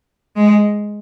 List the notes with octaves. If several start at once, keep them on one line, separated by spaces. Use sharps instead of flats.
G#3